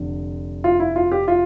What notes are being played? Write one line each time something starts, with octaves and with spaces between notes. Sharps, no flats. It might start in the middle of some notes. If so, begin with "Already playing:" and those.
Already playing: F1 D3
F4
E4
F4
G4
F4